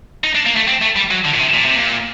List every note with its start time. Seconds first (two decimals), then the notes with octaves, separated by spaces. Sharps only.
0.24 D#4
0.35 D4
0.46 A#3
0.56 A3
0.67 C4
0.82 A3
0.96 G3
1.11 F#3
1.25 D3
1.35 A#2
1.40 C3
1.54 A#2
1.65 C3
1.76 A#2